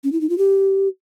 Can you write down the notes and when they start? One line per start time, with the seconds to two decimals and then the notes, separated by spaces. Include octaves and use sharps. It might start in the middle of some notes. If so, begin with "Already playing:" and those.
0.04 C#4
0.12 E4
0.21 D#4
0.30 F4
0.38 G4